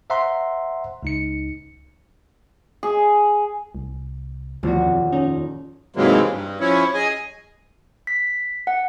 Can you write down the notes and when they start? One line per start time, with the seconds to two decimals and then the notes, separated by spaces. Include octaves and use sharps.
0.10 C5 E5 F#5 A#5 C6
1.03 C#2 D#4 C#7
2.83 G#4
3.75 C2
4.63 D#1 D2 B2 E3 F3 F#4
4.86 F2
5.12 C#4 D#4
5.96 G#2 C3 E3 F#3 G#3 A#3
6.30 G2
6.60 F3 C#4 E4 C#5
6.94 G#4 D#5 G#5
8.07 B6
8.67 F#5